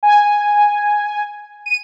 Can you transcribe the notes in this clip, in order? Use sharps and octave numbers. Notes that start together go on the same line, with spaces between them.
G#5
D#7